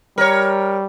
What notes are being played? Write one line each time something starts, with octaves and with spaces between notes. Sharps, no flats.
G3 A#4 C#5